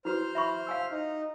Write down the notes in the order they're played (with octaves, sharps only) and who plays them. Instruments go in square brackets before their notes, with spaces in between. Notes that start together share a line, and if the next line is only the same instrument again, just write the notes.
[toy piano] E4 F#4 B4 [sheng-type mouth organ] C5 F6
[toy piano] E5 B5 C#6
F5 G#5 E6
[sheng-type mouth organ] D#4